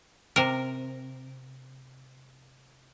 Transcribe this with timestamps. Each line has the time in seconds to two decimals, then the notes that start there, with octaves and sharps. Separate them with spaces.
0.36 C3 A#4